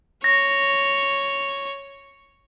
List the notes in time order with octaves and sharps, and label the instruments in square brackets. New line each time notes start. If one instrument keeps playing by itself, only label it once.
[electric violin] C#5 [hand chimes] A#6